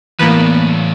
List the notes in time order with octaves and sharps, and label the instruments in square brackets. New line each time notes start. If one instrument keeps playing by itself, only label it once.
[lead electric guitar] E2 A2 [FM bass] E3 [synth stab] A#3 B3 B4